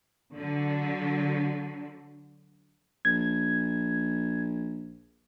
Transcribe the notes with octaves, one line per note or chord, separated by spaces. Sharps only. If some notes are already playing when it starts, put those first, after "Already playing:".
D3 F#3
A#1 G#6